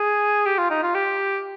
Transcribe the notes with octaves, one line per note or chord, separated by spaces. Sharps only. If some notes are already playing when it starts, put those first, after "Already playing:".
Already playing: G#4
G4
F4
D#4
F4
G4